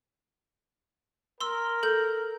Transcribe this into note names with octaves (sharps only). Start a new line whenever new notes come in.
A#4 C6 E6
A4 G6